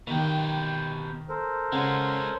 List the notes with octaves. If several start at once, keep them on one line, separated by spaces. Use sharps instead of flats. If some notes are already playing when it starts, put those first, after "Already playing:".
B2 D#3 A#3 G4
A4 A#4 C5
C#3 G#3 C#4 F#5